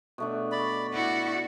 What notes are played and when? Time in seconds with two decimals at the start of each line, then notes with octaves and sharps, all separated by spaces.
0.18 B2 A3 D4
0.52 D5 B5
0.93 E4 F#4 D5 F#5